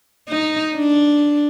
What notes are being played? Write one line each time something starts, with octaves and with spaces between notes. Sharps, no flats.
D#4
D4